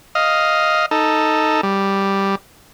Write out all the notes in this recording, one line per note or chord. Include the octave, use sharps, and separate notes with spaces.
D#5 F5
D#4 A4
G3